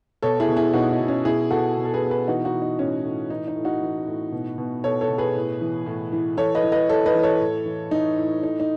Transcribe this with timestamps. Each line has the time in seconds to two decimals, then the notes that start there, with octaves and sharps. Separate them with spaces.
0.22 B2 A4 C#5
0.40 E4 G#4
0.48 B2
0.56 E4 G#4
0.73 B2 D#4 F#4
0.91 D#4
1.00 B2
1.08 C#4
1.25 B2 E4 G#4
1.50 B2 F#4 A4
1.76 B2
1.85 A4
1.94 G#4 B4
2.02 B2
2.10 G#4 B4
2.28 E3 D#4 F#4
2.45 D#4 F#4
2.54 E3
2.62 D#4
2.79 A2 C#4
3.04 A2
3.30 E3 D#4
3.48 D#4
3.56 A2
3.65 D#4 F#4
3.81 E3
4.07 A2
4.32 B2
4.58 B2
4.84 B2 A4 C#5
5.01 A4 C#5
5.09 B2
5.18 G#4 B4
5.35 A2
5.61 E3
5.86 A2
6.12 E3
6.37 E3 A4 C#5
6.55 B4 D#5
6.63 E3
6.72 B4 D#5
6.89 E3 A4 C#5
7.06 B4 D#5
7.15 E3
7.23 A4 C#5
7.41 A2
7.66 E3
7.91 E3 D#4
8.17 A2
8.43 A2 D#4
8.60 D#4